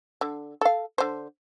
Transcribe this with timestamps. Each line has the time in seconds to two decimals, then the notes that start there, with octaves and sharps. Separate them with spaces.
0.21 D3
0.61 A4 F5
0.98 D3 C5